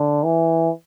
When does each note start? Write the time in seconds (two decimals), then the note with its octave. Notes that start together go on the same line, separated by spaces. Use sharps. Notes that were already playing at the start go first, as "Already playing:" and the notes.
Already playing: D3
0.24 E3